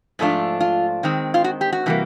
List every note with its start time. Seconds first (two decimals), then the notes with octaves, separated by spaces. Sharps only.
0.19 G#2 F3 A3 D4 F4
0.60 F4
1.03 D#3 G#3 C4
1.34 F4
1.44 F#4
1.61 G4
1.73 F#4
1.86 C3 E3 G3 A#3